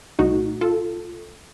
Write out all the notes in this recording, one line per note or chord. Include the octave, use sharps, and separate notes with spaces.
C2 A#2 A3 D#4 F#4
F4 A4